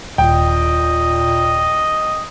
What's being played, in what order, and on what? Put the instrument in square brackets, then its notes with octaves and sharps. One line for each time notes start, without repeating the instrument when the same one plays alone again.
[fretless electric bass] D#1 [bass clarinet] A#2 [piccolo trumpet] D#5 [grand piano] G5